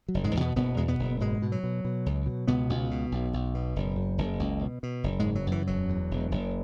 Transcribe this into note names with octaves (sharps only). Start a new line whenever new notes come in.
F#3
F#1
G#2 G#3
E2
B2 B3
F#1 B2 B3
E2 G#3
B2 B3
F#1
G#2 B2 G#3
B2
F#3
B2
B2
C#2
B2
C#2 B2 B3
C#2
B2
B1
B1
B2
F#1
F#2
F#1
C#2
B2
B2
F#1
G#2 G#3
C#3
F#3
F#2 E3
E1 F#3
E2
E1
F#1